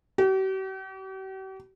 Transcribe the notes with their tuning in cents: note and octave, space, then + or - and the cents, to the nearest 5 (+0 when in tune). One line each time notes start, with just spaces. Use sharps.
G4 -45